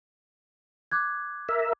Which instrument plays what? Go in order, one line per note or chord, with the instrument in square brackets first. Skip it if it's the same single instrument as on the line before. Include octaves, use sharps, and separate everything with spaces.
[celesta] D6 F#6 G#6
[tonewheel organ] A#4 E5